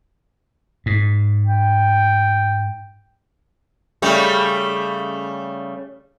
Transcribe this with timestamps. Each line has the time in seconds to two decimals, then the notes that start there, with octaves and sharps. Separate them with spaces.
0.86 G#2
1.46 G5
4.02 C#3 G3 A3